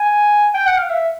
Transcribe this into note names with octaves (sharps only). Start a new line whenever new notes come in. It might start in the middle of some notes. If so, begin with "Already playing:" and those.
Already playing: G#5
G5
F#5
F5
E5